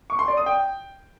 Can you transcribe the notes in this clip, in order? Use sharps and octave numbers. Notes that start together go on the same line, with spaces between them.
C#6
C6
D5
D#6
G5